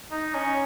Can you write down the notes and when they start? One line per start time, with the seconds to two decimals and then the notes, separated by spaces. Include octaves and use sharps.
0.11 D#4
0.35 C#4